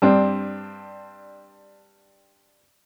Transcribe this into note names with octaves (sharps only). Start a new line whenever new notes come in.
G2 C4 D4